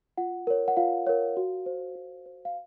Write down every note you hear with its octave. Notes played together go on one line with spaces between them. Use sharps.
F4 F#5
A#4 C#5
F#5
F4 F5
A#4 C#5
F#4
C5
F#4
C5
F5